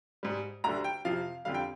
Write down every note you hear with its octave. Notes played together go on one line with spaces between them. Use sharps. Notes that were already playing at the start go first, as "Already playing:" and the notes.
G#2 G3
D2 D3 G3 A#5
G5
F2 C3 F3 F5
F2 D3 G3 F5
G5